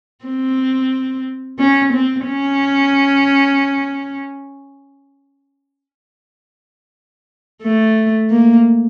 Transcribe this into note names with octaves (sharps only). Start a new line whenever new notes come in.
C4
C#4
C4
C#4
A3
A#3